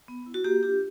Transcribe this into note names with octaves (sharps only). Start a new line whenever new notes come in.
B3
E4
F#4
A#3 G4
D4 F4 G4